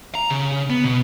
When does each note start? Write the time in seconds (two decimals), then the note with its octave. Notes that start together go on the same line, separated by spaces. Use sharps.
0.15 A#5
0.30 C#3
0.70 B3
0.84 B2